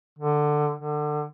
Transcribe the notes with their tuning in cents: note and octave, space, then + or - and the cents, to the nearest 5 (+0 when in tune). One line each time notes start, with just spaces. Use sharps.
D3 +15
D3 +25